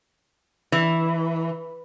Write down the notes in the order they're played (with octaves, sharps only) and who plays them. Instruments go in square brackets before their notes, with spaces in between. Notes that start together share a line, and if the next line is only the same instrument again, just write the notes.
[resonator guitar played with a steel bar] E3